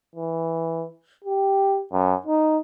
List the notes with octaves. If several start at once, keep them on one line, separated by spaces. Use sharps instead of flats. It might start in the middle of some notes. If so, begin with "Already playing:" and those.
E3
G4
F#2
D#4